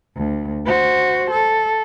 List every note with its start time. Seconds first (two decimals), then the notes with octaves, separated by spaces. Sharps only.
0.17 D2
0.66 F#4 C5
1.31 A4